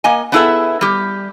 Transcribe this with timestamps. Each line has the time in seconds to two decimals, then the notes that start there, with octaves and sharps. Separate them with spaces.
0.04 A#3 D#5 G#5
0.32 B3 D4 E4 G#4 A4 E5
0.81 G3 G4